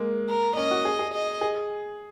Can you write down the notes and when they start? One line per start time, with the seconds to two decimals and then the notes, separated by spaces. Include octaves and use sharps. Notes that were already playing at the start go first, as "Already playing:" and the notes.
Already playing: G#3 A#3
0.29 A#4
0.52 A#3
0.56 C#4 D#5
0.71 F#4
0.85 G#4
0.99 G#4
1.14 D#5
1.41 G#4